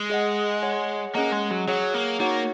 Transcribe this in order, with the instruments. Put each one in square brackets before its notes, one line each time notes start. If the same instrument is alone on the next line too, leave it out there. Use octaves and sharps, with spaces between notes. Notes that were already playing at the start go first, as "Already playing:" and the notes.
Already playing: [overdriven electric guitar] G#3
[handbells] G#4 D#5 F#5
G#4 C#5 F#5
[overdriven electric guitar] A#3 [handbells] C#4 G#4 D#5 F#5
[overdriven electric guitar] G#3
F#3
[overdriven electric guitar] F#3 [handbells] G#4 C#5 F#5
[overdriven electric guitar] A#3
[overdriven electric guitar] A#3 [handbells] D#4 F#4 C#5 F#5